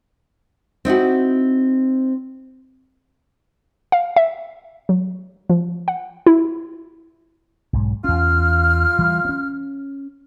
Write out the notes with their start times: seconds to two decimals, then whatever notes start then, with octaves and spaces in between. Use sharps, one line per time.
0.85 C4 D#4 E4 F#4
3.92 F5
4.16 E5
4.89 F#3
5.50 F3
5.88 F#5
6.26 E4
7.73 B1 G#2
8.04 E2 C#4 F4 F5 F6
8.99 E3 G3
9.25 C4 C#4